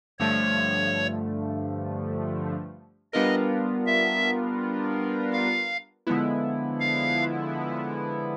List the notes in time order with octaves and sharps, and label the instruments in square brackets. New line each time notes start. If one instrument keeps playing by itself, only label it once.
[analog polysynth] G2 D3 F3 A3 [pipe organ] C#5
[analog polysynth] G3 B3 D4 F4 A#4 [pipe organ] D#5
[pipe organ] E5
F5
[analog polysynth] D3 F3 G#3 B3 E4
[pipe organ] F5